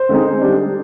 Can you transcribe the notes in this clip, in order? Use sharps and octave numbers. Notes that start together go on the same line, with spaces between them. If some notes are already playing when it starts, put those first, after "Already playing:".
Already playing: C5
D3 G#3 C4 D#4
D3 G3 D4